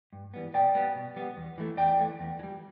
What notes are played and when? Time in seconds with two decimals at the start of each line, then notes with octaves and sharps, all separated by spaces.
0.13 G2
0.34 E3 G3 B3
0.54 B2 D5 G5
0.75 G3 B3
0.95 B2
1.16 G3 B3
1.37 E2
1.58 E3 A3
1.77 E2 D5 G5
1.99 E3 A3
2.20 E2
2.39 E3
2.43 G3